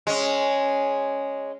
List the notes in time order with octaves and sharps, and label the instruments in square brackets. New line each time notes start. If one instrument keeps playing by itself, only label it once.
[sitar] G#3 C#4